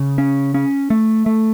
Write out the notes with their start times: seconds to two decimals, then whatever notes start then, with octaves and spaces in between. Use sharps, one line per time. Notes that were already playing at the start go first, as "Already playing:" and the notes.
Already playing: C#3
0.18 C#4
0.54 C#4
0.90 A3
1.26 A3